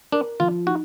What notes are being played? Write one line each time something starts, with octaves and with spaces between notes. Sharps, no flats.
D4 A#4
F3 F4
D#4 F#4